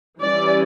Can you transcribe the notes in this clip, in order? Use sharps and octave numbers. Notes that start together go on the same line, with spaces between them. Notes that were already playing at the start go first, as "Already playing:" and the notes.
E3 G3 C#4 D5